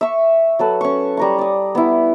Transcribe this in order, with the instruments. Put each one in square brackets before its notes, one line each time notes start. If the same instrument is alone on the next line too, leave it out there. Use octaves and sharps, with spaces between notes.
[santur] E5 C#6
F#3 A4 B4
C#4 C#6
G3 A#5 C#6
D5 D#6
B3 E4